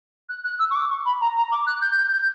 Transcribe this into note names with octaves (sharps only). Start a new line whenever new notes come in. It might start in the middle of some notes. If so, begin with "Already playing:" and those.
F#6
F#6
E6
C#6
D6
C#6
B5
A#5
A#5
D6
F#6
G6
G6
G6